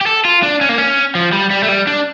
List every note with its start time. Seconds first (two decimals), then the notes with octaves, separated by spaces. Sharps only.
0.01 G4
0.06 A4
0.25 F4
0.43 D4
0.61 C#4
0.69 A#3
0.78 C#4
1.15 F3
1.33 G3
1.51 G3
1.63 A3
1.69 G3
1.87 D4